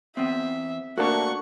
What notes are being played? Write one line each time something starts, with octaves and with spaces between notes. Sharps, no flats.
E2 B3 C4 E5
A3 A#3 D4 F#4 F#5 A5 C#6